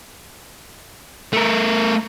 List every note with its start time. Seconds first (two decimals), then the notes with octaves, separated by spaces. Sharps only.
1.33 A3 A#4